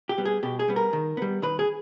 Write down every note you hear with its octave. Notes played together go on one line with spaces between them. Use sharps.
G4
G3 B3
G#4
B2 G4
G#4
G3 B3
A#4
D#3
G3 B3
D#3 B4
G#4